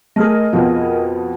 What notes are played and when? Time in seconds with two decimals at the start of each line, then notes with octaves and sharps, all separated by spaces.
0.16 A3 G#4 A#4 D#5
0.53 F2 B2 F3